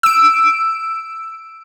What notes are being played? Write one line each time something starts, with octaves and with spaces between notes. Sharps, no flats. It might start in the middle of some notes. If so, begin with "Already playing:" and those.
E6 D7